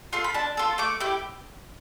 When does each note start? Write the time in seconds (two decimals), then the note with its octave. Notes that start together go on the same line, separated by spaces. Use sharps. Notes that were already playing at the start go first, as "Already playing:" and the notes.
0.13 F4 A4 C6
0.24 B5
0.34 D4 A5
0.57 F4 A4
0.78 A3 D6
1.00 E4 G4